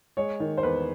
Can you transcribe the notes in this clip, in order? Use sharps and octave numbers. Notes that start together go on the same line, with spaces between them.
G#3 C#5
D#3
C5
E2 B4